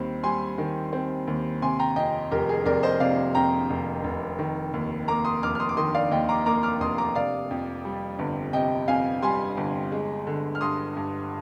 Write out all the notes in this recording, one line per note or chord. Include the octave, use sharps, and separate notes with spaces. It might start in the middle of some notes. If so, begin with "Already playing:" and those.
Already playing: D#2 D#3 G3 C4
G3 G#5 C6
D#3
C4
D#2
C3 G#5 C6
G5 A#5
F2 D#5 G5
F1 G4 A#4
G#4
F1 A#4 D5
C5 D#5
C3 D5 F5
F2 G5 A#5
F1
F1
D#3
D#2
A#3 A#5 D6
C6 D#6
F1 D6 F6
F6
C6 D#6
D6
D#3 C6 D#6
D5 F5
D#2 D#5 G5
A#5 D6
A#3 A#5 D6
D6 F6
F1 C6 D#6
A#5 D6
C3 D5 F5
F2
G3
G1
C3 D#5 G5
F2 F5 G#5
G3 G#5 C6
G1
G#3
D3
F6
G2 C6 D#6
G2